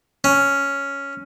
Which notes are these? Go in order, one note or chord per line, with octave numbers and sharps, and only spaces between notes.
C#4